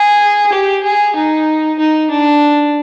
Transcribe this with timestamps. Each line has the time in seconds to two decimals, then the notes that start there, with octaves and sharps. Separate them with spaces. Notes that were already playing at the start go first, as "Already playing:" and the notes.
Already playing: G#4
0.52 G4
0.84 G#4
1.16 D#4
1.79 D#4
2.11 D4